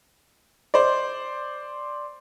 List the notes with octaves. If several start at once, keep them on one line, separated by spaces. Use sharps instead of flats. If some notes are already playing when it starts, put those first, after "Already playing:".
C5 D5